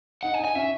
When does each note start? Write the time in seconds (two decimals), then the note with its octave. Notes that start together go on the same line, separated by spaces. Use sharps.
0.23 D#4 F#5
0.34 G#5
0.39 D#4
0.45 G#5
0.55 C#4 E5